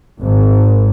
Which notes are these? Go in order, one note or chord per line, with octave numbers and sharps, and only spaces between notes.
G#1 G#2